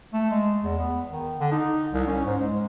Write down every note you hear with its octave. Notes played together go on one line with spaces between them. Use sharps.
A3
G#3
E2
B3
D#3
D3
D#4
C2
C#4
G#2
G#3